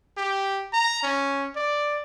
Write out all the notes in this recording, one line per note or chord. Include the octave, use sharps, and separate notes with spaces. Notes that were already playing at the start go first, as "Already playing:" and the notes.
G4
A#5
C#4
D5